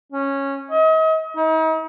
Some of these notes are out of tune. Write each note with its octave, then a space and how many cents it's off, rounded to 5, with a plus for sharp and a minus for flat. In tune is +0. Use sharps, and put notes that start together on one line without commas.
C#4 -10
D#5 +40
D#4 +40